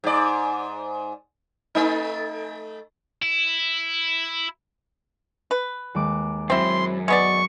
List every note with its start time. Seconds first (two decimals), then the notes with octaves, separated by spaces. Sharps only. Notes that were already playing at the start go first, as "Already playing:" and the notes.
0.04 G#2 D5
1.75 A3 D#4
3.22 E4
5.51 B4
5.95 D#2 G#3 D6
6.50 F#2 C4 E4 C6 E6
7.08 G#3 B3 D5 C#6